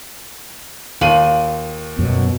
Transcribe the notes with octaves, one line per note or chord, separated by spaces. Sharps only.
D#2 F4 D#7 F#7
F#2 B2 F#3